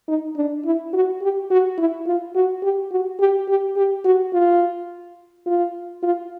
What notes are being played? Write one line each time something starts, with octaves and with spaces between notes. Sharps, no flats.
D#4
D4
E4
F#4
G4
F#4
E4
F4
F#4
G4
F#4
G4
G4
G4
F#4
F4
F4
F4